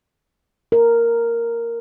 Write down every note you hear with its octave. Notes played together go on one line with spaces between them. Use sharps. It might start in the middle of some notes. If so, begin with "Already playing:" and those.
A#4